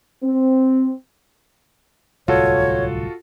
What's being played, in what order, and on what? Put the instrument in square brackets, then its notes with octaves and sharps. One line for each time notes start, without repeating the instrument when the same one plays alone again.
[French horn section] C4
[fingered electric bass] D1 C2 [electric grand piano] F4 F#4 A4 [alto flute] C#5